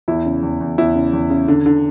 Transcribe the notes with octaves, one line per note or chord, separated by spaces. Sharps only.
E2 E4
C#3
E2
E2
E2 E4
C#3
E2
C#3
D3
D3